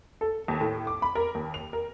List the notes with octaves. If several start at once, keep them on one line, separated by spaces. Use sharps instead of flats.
A4
D#2
A2
D6
B5
A#4
D#2
F7
A#4